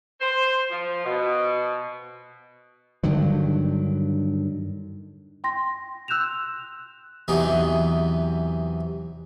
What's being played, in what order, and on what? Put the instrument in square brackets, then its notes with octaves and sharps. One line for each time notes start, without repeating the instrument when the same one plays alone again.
[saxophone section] C5
F3
B2
[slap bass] G2 D3 D#3 F#3
[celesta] G5 C6 A#6
E6 F#6 G6 E7 F7
[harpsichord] E2 C3 E3 F#3 D#4